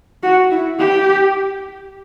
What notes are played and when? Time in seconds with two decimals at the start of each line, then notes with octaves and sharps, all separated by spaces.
0.23 F#4
0.51 E4
0.79 G4